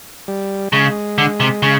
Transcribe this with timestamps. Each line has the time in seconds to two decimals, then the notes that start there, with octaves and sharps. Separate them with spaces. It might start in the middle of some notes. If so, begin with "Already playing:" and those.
0.28 G3
0.73 C#3 G#3
1.18 D3
1.40 C3
1.63 C#3